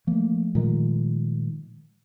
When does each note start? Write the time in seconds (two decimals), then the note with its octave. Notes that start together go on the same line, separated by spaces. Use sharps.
0.07 F3 A3 A#3
0.55 A#2 D#3 G#3